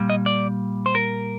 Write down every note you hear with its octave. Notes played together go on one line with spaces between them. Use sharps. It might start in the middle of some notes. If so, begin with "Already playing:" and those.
Already playing: A#2 G3
D#5
D5
C5
A#4